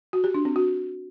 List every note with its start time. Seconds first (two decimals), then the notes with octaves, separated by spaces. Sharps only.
0.13 F#4
0.24 G4
0.35 D4
0.45 C4
0.56 F#4